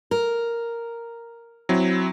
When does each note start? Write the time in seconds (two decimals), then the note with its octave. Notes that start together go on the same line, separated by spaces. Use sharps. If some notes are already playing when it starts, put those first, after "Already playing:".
0.11 A#4
1.69 F#3 C4 E4